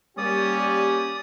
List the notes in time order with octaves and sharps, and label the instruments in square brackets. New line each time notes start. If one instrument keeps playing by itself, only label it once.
[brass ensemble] G3 A#3 G4 [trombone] C#4 [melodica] D5 D#6